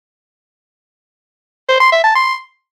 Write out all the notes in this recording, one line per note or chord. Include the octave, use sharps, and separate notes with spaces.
C5
C6
E5
A5
C6